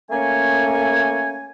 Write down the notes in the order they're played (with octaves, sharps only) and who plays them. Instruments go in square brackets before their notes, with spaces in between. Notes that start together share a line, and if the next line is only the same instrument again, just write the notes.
[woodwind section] A3 A#3 C#4 C#5 G#5